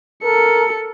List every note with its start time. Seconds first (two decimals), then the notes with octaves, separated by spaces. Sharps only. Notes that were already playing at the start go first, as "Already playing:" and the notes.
0.24 A4 A#4 C#7